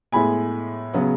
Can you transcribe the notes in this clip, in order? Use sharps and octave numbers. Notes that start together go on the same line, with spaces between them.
A2 G#3 B3 G#5 B5
C#3 F#3 B3